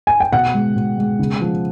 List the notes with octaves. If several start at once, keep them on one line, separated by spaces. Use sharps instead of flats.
G#5
G5
B2 F#5
G#3
B2
G#3
C#3
F3